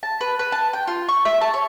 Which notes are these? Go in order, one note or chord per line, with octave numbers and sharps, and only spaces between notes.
A5
B4
B4
A5
G5
F4
C#6
E5
A5
C#5